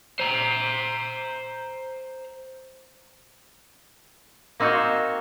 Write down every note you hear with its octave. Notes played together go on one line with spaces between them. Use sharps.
C5 A#5
A#3 C4 D#4 F#4 C5 C#5